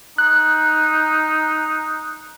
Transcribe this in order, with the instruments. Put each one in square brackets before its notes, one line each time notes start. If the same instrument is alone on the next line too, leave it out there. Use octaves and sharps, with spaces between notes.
[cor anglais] D#4 [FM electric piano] F#6